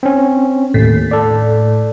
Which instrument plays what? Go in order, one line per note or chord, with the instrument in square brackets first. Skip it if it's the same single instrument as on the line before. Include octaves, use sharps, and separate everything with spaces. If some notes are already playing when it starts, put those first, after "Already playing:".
[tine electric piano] C4 C#4
[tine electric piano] D#2 [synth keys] A2
[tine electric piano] A4 D5